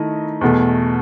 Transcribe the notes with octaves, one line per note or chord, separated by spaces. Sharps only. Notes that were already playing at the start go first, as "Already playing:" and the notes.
Already playing: D#3 A3 E4 D#5
E2 B2 A3